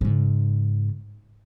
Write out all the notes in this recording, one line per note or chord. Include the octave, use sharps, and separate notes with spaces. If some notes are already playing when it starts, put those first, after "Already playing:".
G#2 C#3